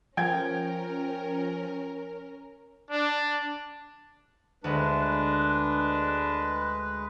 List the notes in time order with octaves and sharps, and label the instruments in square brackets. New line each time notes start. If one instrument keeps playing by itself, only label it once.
[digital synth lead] F3 [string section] C#4 A#4 [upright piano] G5 G#6
[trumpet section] D4
[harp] D2 F#5 [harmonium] G#3 B4 [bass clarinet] D4